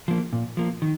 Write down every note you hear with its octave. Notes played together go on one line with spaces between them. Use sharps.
F3 A#3
A#2
F3 A#3
D#3